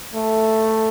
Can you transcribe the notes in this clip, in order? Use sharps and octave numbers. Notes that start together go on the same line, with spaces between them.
A3